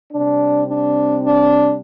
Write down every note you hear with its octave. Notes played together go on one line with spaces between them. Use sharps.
C3 G3 C4 D4
D4
D4